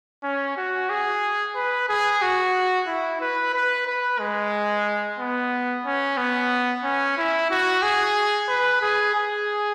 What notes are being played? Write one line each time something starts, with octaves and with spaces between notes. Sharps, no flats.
C#4
F#4
G#4
B4
G#4
F#4
E4
B4
B4
B4
G#3
B3
C#4
B3
C#4
E4
F#4
G#4
B4
G#4
G#4